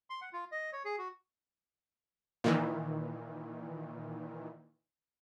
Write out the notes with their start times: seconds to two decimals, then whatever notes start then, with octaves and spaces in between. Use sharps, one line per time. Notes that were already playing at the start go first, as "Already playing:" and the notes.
0.10 C6
0.21 F#5
0.33 F4
0.52 D#5
0.73 C#5
0.85 G#4
0.98 F#4
2.44 A#2 D#3 E3